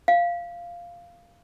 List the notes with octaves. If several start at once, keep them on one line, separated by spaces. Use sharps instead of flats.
F5